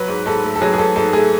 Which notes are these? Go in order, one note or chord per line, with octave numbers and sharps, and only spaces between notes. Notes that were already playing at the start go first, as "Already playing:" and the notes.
Already playing: F#3 B4
G#2
G#2 A4
A3
A4
F#3 G#4
G#4
G#2 A4
G#2 A4
A3 G#4